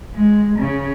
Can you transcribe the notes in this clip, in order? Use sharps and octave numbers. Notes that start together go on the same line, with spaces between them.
G#3
C#3